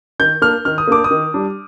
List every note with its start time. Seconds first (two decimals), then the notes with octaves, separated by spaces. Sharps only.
0.19 D#3 G6
0.42 A#3 D4 F6
0.65 D#3 F6
0.78 D#6
0.87 A#3 D4 D6
1.04 D#6
1.11 D#3
1.34 G3 D4